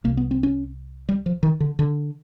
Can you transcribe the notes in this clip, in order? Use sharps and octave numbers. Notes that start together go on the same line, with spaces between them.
C2 C3 A#3
B3
C4
C#4
G3
F3
D#3
D3
D3